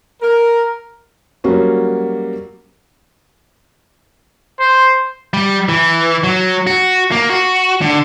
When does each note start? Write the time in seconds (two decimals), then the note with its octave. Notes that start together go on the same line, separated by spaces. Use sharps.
0.22 A#4
1.44 F#3 G3 A#3 C#4 F#4
4.60 C5
5.34 G3
5.69 E3
6.24 F#3
6.67 F#4
7.12 A#3
7.30 F#4
7.81 D3